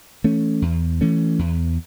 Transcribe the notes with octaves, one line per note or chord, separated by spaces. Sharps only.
E3 A3 C#4
E2
E3 A3 C#4
E2